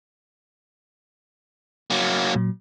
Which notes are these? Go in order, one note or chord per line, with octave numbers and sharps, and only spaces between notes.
F#3 A#3
A#2 F#3